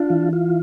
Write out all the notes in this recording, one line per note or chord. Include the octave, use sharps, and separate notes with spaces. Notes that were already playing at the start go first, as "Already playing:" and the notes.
Already playing: D4 F4
E3
F4